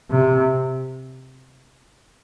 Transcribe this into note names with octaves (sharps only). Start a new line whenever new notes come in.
C3